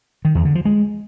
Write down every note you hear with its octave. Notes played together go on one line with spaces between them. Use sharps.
D#3
E2
D3
F3
G#3